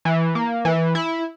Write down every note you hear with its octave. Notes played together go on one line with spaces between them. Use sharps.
E3
A#3
E3
E4